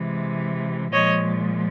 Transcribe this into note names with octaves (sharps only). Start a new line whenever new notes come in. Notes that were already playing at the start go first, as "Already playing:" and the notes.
Already playing: C3 E3 G#3
A#2 F3 G#3 C#5 D#5